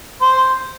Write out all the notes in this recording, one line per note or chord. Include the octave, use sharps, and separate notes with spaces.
C5